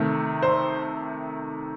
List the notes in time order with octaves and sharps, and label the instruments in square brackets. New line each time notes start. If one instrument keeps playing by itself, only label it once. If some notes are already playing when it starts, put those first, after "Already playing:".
Already playing: [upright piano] C3 D#3 A3
C5